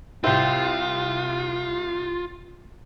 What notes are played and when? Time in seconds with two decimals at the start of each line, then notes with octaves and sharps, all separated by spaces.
0.24 C2 C4 E4 F4